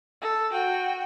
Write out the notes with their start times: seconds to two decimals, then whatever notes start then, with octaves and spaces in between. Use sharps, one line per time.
0.22 A4
0.52 F#4 G5